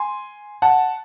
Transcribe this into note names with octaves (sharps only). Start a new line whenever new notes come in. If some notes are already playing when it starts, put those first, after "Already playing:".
Already playing: G#5 C6
F#5 A5